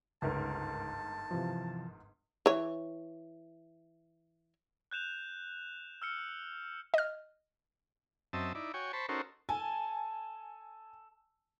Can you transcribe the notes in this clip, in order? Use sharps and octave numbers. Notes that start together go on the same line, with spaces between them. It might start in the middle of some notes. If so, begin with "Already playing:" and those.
G1 C#2 G#2 A#4 A5
C3 E3 F3
E3 C#5
F#6 G6 E7 F7
E6 F6 C#7
D#5 F6
F#2 C4 D#5 E5 A5
D#4 E4 D5
F#4 C#5 G5 G#5
C5 A5 B5 C#6
C#4 D#4 F#4 A4 A#4 C5
A4 G#5